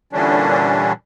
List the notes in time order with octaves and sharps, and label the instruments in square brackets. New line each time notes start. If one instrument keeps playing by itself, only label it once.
[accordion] A#2 D3 E3 G3 C#4 D4